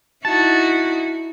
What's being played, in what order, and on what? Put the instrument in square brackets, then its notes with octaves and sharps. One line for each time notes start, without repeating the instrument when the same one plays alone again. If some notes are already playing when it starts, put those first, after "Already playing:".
[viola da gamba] D#4 E4 F#4 [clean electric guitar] A5